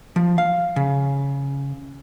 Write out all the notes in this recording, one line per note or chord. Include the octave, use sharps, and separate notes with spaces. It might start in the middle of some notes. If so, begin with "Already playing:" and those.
F3
F5
C#3